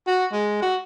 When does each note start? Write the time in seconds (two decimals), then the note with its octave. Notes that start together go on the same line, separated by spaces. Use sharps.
0.07 F#4
0.32 G#3
0.62 F#4